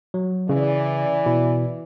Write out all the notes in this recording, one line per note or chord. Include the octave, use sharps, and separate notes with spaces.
F#3
C#3 E3 D5
B2 E4